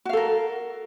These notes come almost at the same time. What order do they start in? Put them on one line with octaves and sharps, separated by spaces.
F#4 F5 A4 A#4